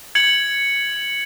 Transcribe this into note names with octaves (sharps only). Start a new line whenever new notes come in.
G#6 C#7 F#7